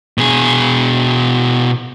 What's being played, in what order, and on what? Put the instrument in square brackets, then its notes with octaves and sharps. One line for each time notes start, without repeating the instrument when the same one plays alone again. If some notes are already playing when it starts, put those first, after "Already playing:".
[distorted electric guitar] B2 G#4